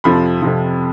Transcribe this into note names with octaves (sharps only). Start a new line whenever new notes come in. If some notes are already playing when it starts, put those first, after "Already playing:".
F2 C3 F3 B5
F2 C3 F3